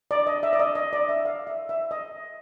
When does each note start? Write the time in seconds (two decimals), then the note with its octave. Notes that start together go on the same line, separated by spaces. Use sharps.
0.11 D5
0.27 D#5
0.43 E5
0.53 D5
0.59 D#5
0.75 D#5
0.93 D5
1.09 E5
1.25 F5
1.47 E5
1.69 E5
1.91 D#5